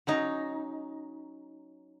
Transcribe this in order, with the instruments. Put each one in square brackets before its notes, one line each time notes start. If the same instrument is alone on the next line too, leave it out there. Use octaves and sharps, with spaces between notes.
[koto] F#3 C#4 D#4